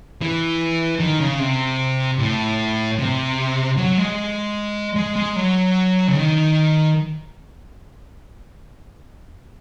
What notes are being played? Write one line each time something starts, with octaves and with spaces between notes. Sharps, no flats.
E3
D#3
C#3
C3
A2
C3
F#3
G#3
G#3
G#3
F#3
C#3
D#3